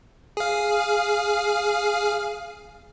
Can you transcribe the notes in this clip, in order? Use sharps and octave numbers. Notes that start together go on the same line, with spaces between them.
G#4 F5